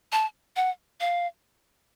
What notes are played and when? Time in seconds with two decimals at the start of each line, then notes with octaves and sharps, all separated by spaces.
0.12 A5
0.56 F#5
1.00 F5